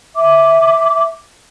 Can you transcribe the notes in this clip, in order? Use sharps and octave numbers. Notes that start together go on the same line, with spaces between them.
E5 D6